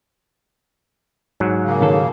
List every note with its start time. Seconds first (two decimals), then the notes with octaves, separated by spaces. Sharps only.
1.40 G#2 F#3
1.64 C#3 A#3
1.82 D#3 A4